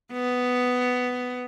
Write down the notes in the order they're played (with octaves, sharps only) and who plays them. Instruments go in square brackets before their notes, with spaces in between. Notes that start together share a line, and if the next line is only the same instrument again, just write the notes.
[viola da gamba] B3